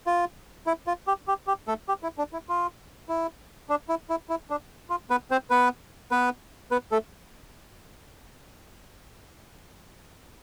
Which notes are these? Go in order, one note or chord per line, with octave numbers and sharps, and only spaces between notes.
F4
E4
F4
G4
G4
G4
A3 A4
G4
E4
D4
E4
F4
E4
D4
E4
E4
E4
D4
F4
B3 B4
C4 C5
B3 B4
B3 B4
B3 B4
A3 A4